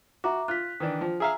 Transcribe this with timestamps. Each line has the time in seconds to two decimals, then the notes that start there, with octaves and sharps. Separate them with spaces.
0.24 F#4 E5 A#5 D6
0.48 F4 F#6 B6
0.80 D#3 E3 D4
1.01 F3
1.20 G#4 E5 F5 G#5 A#5